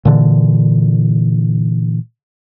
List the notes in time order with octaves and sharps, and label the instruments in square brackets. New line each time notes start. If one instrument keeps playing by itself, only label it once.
[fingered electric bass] A#2 D3 E3